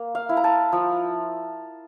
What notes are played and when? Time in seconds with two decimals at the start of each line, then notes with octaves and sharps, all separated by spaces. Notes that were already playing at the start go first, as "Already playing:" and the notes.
Already playing: A#3
0.15 F5
0.29 E4
0.37 A#5
0.44 A5
0.72 F3